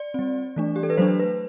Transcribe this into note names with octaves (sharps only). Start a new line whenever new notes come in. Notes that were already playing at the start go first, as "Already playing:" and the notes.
Already playing: D5
G3 C4
E3 A3 D4
G4
A4
B4
F#3 A3 D4 C5
B4